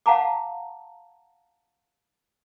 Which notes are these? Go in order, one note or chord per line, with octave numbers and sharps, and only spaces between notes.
F5 F#5 A5 A#5 D6